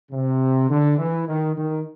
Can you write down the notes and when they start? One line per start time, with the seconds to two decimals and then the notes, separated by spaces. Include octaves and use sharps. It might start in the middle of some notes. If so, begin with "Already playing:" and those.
0.11 C3
0.69 D3
0.98 E3
1.26 D#3
1.56 D#3